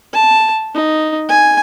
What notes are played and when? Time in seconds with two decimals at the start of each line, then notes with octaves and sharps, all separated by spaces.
0.13 A5
0.74 D#4
1.29 G#5